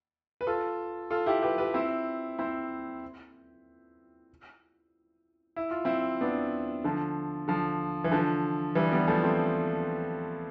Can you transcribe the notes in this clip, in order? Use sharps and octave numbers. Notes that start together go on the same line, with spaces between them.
B4
F4 A4
F4 A4
E4 G4
G4 B4
G4 B4
C4 E4
C4 E4
E4
F4
C4 E4
B3 D4
D3 F3
D3 F3
E3
D3 F3
E3 G3
G3 B3
F3 A3
A3 C4